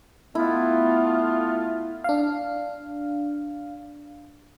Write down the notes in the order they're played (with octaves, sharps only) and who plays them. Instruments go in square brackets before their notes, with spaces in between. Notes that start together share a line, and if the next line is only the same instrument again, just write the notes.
[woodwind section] A3 B3 F4 [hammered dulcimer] E4
[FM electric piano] D4 F5